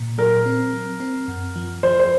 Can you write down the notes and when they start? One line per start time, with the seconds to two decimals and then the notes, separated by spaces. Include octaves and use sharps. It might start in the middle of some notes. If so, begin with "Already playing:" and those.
Already playing: A#2
0.18 F#3 A#4
0.46 C4
0.73 F#3
1.00 C4
1.28 F#2
1.56 F3
1.83 F3 C5
2.00 C5